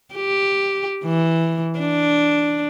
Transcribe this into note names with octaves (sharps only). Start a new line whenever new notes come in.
G4
E3
D4